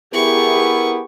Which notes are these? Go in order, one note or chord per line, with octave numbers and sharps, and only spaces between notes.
B3 E4 G4 G#4 A#4 C#6